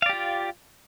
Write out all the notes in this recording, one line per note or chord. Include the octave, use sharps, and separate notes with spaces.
F4 G4 D5 F5